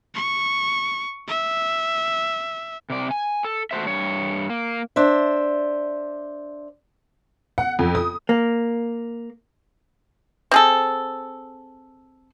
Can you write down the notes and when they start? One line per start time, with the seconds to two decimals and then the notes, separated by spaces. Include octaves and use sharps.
0.15 C#6
1.28 E5
2.90 C3 D5
3.11 G#5
3.45 A4
3.71 A3 F#4 C5 E5
3.87 G2 C#5
4.50 A#3
4.96 D4 C5 E5
7.58 F#5
7.79 F2
7.95 D#6
8.29 A#3
10.51 C4 G#4 A4